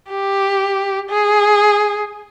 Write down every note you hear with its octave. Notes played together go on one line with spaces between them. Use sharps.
G4
G#4